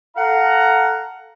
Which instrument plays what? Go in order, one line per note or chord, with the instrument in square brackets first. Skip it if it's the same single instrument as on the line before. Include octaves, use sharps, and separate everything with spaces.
[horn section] A4 F5 F#5 A#5